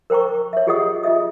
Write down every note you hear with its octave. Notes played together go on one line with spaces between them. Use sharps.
A#4 C5 G5 A#5 C#6
C#5 E5
F4 G4 G#4 D#5 F#5 D#6
F4 G#4 D#5 E5 D#6